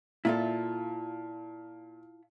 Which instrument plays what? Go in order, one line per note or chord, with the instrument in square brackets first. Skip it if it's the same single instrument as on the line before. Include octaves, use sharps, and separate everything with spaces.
[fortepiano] A#2 [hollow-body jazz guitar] E4 F4 A4